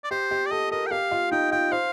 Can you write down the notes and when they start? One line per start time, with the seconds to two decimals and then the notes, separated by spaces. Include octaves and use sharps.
0.04 D5
0.11 G4 C5
0.31 G4
0.46 D5
0.51 A4 D#5
0.72 A#4 D#5
0.87 G5
0.91 G4 F5
1.11 F4
1.31 D#4 G5
1.51 F4 G5
1.72 C5 F5